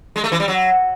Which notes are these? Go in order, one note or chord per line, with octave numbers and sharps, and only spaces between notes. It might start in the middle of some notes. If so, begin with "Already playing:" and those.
G#3
A3
E3
G3
F#3